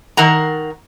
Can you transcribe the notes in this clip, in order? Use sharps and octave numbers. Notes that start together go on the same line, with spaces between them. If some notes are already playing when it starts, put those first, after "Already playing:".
D#3 A#4 F#5 A#5